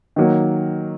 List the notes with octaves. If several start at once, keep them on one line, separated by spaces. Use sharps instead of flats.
D#3 F#3 A#3